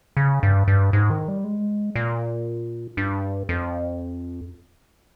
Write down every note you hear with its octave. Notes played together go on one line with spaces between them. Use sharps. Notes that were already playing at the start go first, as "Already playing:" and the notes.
C#3
G2
G2
G#2
D#3
G3
G#3
A#2
G2
F2